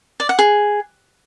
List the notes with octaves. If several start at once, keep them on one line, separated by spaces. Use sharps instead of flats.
D5
F#5
G#4